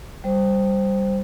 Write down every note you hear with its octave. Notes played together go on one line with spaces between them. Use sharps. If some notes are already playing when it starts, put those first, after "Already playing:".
G3 C5